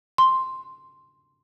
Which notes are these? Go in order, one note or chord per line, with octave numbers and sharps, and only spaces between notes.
C6